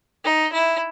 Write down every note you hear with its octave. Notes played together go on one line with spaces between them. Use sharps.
D#4
E4